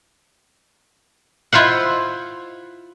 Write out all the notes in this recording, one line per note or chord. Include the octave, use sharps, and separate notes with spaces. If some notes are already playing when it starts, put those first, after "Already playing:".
E4 F4 C5 F5 F#5